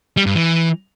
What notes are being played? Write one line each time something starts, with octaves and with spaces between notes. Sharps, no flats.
G3
G2
E3